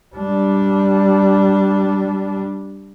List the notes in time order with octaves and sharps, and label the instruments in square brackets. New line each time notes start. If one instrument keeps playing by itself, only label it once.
[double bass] G3 D4